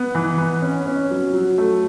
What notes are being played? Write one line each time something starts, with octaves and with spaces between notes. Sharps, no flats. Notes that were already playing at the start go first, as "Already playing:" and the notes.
Already playing: B3
E3
B3
C#4
C#4
F#3
F#3
A3